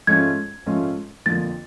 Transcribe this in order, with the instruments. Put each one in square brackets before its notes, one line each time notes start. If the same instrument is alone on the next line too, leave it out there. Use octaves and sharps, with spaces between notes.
[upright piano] G#2 F3 A3 C#4 F4 [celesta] G#6
[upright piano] G#2 F3 A3 C#4 F4
[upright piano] F2 D3 F3 A#3 [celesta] A6